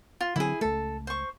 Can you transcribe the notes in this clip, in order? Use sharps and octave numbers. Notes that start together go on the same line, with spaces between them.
F4
D3 F#3 C4 E4 G#4
C#2 A3 A4
C5 C#6